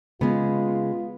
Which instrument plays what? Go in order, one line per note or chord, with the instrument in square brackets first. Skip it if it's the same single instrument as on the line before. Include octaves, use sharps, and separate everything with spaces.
[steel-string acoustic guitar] C#3 G#3 [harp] B3 [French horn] F4